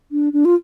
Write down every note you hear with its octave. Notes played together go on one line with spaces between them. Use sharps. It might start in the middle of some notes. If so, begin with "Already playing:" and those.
D4
D4
F4